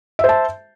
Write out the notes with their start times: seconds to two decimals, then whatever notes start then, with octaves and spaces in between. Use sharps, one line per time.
0.19 E5
0.24 C5
0.29 A5